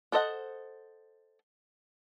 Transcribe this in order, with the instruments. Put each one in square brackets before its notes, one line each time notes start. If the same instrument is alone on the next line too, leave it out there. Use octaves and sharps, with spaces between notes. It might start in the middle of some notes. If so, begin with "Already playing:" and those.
[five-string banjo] D4 A4 C5 D#5 F#5